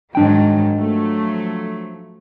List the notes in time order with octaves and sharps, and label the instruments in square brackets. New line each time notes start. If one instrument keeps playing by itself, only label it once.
[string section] G#2 D#3 F#3 [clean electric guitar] D4 G5
[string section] F3 F#3 A3